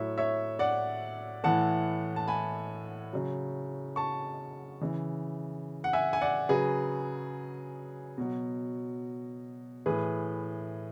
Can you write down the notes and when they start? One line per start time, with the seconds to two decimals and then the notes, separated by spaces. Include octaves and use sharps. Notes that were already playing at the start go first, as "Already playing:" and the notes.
Already playing: A2 F#3 C#5 E5
0.18 C#5 E5
0.59 D5 F#5
1.44 A2 E3 F#5 A5
2.16 A5
2.28 G#5 B5
3.13 C#3 F#3
3.96 A5 C#6
4.81 C#3 E3
5.84 F#5
5.93 E5 G#5
6.13 G#5
6.21 D5 F#5
6.49 C#3 F#3 G#4 B4
8.18 B2 F#3
9.86 A2 E3 G#4 B4